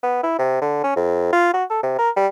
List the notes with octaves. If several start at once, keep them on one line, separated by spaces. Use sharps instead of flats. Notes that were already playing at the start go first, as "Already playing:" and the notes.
B3
E4
C3
D3
C#4
F2
F4
F#4
A4
C3
A#4
G3